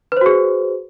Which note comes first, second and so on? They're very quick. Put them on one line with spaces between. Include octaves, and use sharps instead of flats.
B4 C5 F#4 G#4